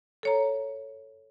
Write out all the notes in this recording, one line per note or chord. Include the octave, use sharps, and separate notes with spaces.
A4 C#5 A#5